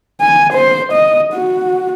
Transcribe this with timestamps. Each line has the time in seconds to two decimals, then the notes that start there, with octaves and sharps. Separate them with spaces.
0.21 G#5
0.53 C5
0.93 D#5
1.33 F#4